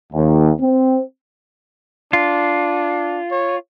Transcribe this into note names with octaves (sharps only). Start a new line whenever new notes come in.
D#2
C4
D4 F4
C#5